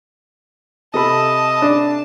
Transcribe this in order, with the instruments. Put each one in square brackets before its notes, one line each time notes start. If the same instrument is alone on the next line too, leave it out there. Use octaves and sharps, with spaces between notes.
[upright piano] C3 A4 B5 [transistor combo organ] D#5 [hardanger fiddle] A5
[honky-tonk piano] D4